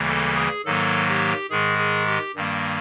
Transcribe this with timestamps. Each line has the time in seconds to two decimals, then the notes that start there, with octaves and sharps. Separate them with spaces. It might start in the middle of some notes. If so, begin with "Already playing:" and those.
Already playing: D2 C#3 E3 G3 A#3
0.08 A4
0.36 G#4
0.65 G#2 D#3 F#3 A#3 A4
1.08 G4
1.50 G#2 D#3 G#3 G#4
1.78 G#4
2.06 G4
2.35 G2 D#3 G3 A#3